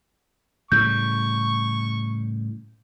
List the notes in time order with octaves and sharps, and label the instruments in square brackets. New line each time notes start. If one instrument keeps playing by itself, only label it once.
[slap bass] A2 C#3 G3 [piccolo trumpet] C#6 [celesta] G6